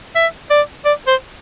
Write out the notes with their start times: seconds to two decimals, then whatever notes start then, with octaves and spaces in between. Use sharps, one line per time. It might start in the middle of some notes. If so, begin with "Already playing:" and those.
0.16 E5
0.51 D5
0.86 D5
1.08 C5